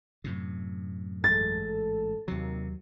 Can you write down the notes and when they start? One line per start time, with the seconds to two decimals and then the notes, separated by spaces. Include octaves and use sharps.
0.24 F#2 A2 C3
1.24 A1 G#2 A4 A6
2.28 D#2 C3 D#3 F#3 A#3